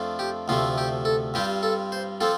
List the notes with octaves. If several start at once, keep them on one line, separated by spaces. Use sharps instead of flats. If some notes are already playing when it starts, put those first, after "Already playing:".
Already playing: F2 F3 A3 D4 F4
G4
D2 C3 F3 A3 F4
G4
A4
G2 G3 C4 F4 G4
A4
C5
F3 C4 F4 A4